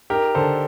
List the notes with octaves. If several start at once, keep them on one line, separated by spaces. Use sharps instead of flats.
D#4 G4 A#4
D3 A4 C5